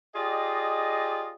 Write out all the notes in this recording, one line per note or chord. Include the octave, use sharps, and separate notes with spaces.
F4 G4 G#4 D5 D#5